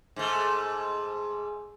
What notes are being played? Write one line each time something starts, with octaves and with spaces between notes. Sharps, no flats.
G#2 A3